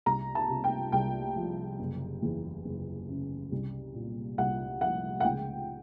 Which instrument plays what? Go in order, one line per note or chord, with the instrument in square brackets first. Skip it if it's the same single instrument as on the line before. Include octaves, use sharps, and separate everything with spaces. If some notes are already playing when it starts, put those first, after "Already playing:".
[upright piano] C2 A#5
A5
C3
G5
C2 G5
F3
F#1
E2
F#1
C#3
C2
A#2
C2 F#5
F3 F#5
F#5
C#2 G5